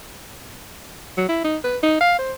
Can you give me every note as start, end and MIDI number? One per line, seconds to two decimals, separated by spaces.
1.18 1.27 54
1.29 1.41 64
1.45 1.57 63
1.64 1.78 71
1.83 1.99 63
2.01 2.16 77
2.19 2.33 72